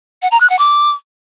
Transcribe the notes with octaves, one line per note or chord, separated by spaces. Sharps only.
F#5
A#5
F#6
F#5
D6